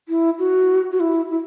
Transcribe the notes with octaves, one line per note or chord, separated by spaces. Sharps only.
E4
F#4
F#4
E4
E4